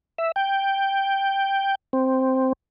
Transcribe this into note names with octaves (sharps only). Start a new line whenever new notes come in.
E5
G5
C4